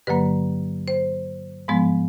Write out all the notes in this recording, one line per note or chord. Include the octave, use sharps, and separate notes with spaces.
G2 D3 F#3 A#3 B4
C5
G#2 F3 G#3 B3